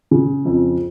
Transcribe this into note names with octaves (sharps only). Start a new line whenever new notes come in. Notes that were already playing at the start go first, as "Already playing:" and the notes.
C#3
F2